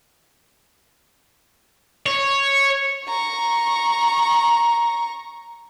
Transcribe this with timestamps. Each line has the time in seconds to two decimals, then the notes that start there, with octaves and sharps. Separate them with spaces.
2.06 C#5
3.05 A#5 C#6